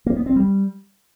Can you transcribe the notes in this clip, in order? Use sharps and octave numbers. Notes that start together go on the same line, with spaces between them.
A#3
B3
C4
G3